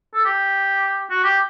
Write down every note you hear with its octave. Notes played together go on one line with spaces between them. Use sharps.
A4
G4
F#4
G4